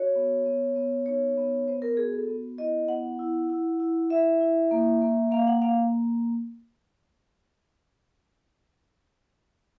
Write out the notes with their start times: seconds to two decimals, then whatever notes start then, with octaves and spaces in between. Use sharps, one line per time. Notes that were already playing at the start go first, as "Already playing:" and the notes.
Already playing: F#4 C#5
0.16 B3
0.46 B3
0.76 B3
1.06 D#4 C#5
1.37 B3
1.68 B3 C5
1.82 A#4
1.97 F#4 G#4
2.13 A4
2.28 B3
2.58 E4 D#5
2.88 B3 F#5
3.19 E4
3.50 E4
3.80 E4
4.10 E4 E5
4.41 E4
4.71 A#3
5.02 A#3
5.31 A#3 F5
5.47 F#5
5.62 A#3 F5